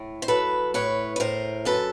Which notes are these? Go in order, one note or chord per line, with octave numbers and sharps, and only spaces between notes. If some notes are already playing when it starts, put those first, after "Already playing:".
Already playing: A2
C5
F#3 A4 B4
A2 B4 C#5
B4
A2 A#4 C5
F#2 A4 B4